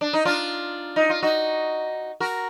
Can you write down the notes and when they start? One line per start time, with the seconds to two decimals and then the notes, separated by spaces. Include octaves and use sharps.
0.01 D4
0.13 D#4
0.25 D4 F4
0.96 D#4
1.10 F4
1.23 D#4 F#4
2.20 F#4 A#4